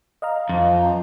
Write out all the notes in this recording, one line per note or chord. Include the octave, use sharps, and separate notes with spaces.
D#5 F5 A#5
F2 F3